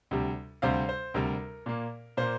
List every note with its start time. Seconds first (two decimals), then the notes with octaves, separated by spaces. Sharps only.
0.11 D2 C3 G3
0.62 D2 C3 G3 C5 F5
0.89 C5
1.14 D2 C3 G3 A#4
1.66 A#2 A#3
2.17 A#2 A#3 C5